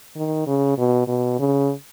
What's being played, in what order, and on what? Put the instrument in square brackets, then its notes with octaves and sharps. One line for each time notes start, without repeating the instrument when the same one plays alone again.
[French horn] D#3
C#3
B2
B2
C#3